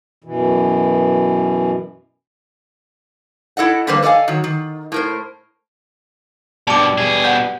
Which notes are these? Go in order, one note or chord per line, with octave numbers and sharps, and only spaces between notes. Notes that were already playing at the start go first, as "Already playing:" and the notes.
F#2 B2 E3
E4 A4 D#5 F#5
D3 F3 G3 A#3 B4 C5
A4 D5 D#5 F5 G#5
D#3 F#3
D#3
A2 A#4 C5
G2 B2 G3 A5 D6
B2 G#4
F#5 G6